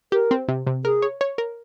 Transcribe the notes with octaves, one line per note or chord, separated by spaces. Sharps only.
G4 A#4
C4
C3
C3
G#4 A#4
C#5
C#5
A#4